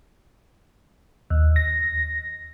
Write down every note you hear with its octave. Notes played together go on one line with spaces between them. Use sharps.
D#2
A#6